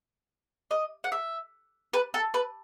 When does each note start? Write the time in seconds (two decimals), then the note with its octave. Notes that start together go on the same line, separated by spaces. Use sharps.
0.71 D#5
1.04 F#5
1.12 E5
1.94 B4
2.14 A4
2.34 B4